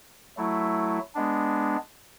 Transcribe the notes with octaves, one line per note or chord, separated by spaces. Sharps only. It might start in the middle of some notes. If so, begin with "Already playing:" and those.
F#3 A3 E4
G#3 B3 D4